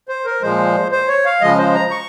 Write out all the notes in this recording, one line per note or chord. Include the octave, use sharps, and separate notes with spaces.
C5
A#4
A#2 F3 G#3 C5
C5
C#5
F5
C#3 F3 G#3 D#5
C5
A#5
C#6